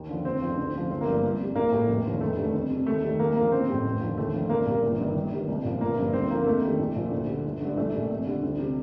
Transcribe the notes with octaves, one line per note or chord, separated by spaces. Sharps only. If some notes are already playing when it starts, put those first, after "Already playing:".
Already playing: D#2
D3 F3
F1 C4
F2 D3 F3
D2
C3 F3
G1 C4
A#3
G2 F3
C2
C3 G3
A#1 A#3
A2 G3
F1
D#2 D3 F3
F1 A3
D#2 D3 G3
F2
C3 G3
D#2 A3
D#3 G3
D#2 A#3
D3 F3 A#3
A1 C4
A2 G3
F1
D#2 D3 F3
D#2 A3
D3 F3
C2 A#3
A#2 G3 A#3
G1
G2 D#3
G1
G2 D#3 G3
C2
A#2 F3
G1 A#3
G2 F3
D2 C4
D3 F3 A#3
A#3
F2 A3
D#3 G3
A#1
A#2 F3
D2
D3 G3
G1
G2 D3
A#1 A3
A#2 G3
F2
D3 G3
D2
C3 G3